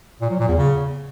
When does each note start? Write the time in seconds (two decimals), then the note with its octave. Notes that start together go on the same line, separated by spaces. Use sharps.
0.21 A#2
0.30 F#3
0.39 A#2
0.48 E2
0.57 C#3